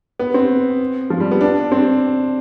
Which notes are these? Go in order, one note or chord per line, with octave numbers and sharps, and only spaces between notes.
B3
C4
F3
G3
B3
D4
C4